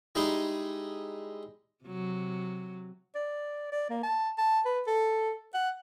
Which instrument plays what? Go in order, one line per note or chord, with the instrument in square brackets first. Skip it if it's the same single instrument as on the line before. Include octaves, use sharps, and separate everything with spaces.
[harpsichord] G3 G#3 D#4 E4 G#4
[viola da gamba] C3 F#3
[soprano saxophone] D5
D5
A#3
A5
A5
B4
A4
F#5